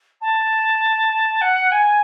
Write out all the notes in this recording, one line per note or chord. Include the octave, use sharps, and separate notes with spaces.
A5
F#5
G#5